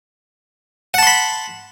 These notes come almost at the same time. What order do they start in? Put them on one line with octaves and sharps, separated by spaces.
F#5 A5 C6 B5